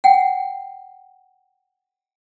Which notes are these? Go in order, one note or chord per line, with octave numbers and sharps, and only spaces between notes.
F#5 G5